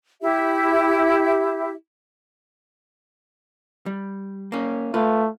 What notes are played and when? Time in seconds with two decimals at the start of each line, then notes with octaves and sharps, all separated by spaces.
0.22 E4 G4 E5
3.86 G3
4.52 A#3 C#4
4.94 A3 F4 B4